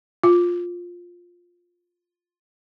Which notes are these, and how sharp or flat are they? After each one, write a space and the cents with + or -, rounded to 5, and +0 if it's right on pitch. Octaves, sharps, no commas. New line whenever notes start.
F4 +10